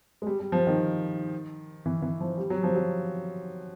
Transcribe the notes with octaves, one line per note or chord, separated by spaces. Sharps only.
G#3
G3
G3
F3
D#3
E3
E3
F3
G3
F#3
F3
F#3